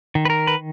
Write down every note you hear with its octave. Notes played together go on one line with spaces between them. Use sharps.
D#3
B4
A#4
B4